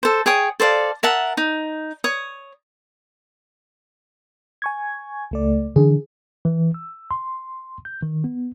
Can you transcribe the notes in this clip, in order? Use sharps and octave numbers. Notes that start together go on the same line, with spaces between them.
A4 C5
G#4 C#5 G5 D#6
A4 C5 D5 F5
A#4 E5 F#5 A5
D#4
C#5 D#6
G#5 C#6 G#6
C#2 A3 D5
D3 E3 D4 G#4
E3
E6
C6
G6
D#3
B3